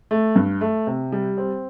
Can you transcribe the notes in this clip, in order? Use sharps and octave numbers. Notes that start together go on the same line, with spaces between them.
A3
G2
A3
C3
G3
C4